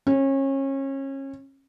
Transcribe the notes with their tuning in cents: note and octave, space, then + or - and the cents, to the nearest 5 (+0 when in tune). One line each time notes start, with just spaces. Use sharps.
C#4 -30